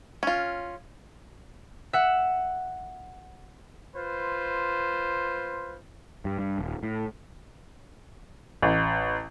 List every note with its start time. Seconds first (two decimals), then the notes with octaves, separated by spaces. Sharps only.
0.23 C#4 F4
1.93 E5 F#5
3.96 F4 B4 C5
6.25 G2
6.39 G2
6.59 D#1
6.83 A2
8.63 A1